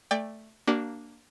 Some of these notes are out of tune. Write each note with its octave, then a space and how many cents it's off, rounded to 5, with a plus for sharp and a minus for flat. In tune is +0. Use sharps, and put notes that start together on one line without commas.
A3 +0 D5 +5 G5 +35
A#3 +0 D4 +0 F#4 +45